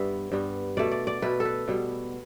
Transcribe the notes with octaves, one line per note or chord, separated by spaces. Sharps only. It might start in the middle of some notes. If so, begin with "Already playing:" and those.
Already playing: G2 G3 B3 E5
G2 G3 B3
B2 A3 D5
D5
D5
B2 A3 B4
A4
B4
B2 G3 B3